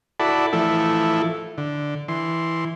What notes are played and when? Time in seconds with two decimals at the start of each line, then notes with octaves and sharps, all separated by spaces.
0.20 E4 F#4 A4 D5 A5 B5
0.53 E3 F3 A3 E4 A4
1.58 D3
2.08 E3 C6